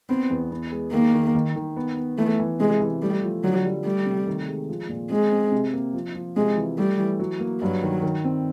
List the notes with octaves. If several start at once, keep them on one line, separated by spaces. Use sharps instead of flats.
B3 C4
E2
B3
G#3
D#3 A#3
D#3
D#3
D#3
B3
B3
E3 A3
E3
C3 G#3
E3
G3 A3
F3
D3 F#3
G3
G3 A3
C3
D#3
G#3
F3
A#2
G#3 C4
C4
C3
A#3
F3
F3
C3 G#3
E3
G3 A3
E3
F#3
A#3
G2 F#3
D#3
D#3
C4